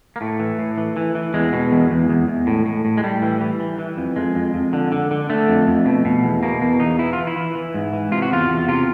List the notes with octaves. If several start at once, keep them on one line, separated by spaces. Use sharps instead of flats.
A#3
A2 A3
E3
A2
E3
E3
E3
E2 G#3
B2
E2
E2
E2
E2
A2
A2
A2
G#3
A2 G3
E3
E3
E3
E3
F2
F2 G#3
F2
F2
D3
D3
D3
D3 A3
F2
F2
B2
B2
E2
B2 A#3
E2 A#3
E2 D#4
E3 E4
E3 F4
E4
E3
E3
G#2
E3
C3 F4
F#4
E2 F4
E2
C3 F4